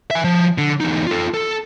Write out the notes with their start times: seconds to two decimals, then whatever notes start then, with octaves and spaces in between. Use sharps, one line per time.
0.11 E5 G#5
0.24 F3
0.58 D3
0.80 E2 D#4
1.07 F4 A4
1.34 A4